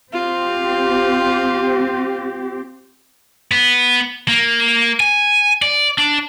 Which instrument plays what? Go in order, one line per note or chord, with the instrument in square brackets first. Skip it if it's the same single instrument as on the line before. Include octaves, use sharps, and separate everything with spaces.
[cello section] C4 G4 [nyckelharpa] F4
[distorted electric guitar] B3
A#3
G#5
D5
D4